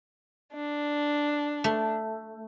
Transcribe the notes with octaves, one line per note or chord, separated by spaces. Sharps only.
D4
A3